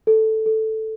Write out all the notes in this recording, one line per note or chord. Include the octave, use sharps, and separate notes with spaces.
A4
A4